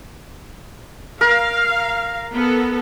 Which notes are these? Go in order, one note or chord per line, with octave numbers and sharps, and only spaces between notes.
A#4 F5
B3 A4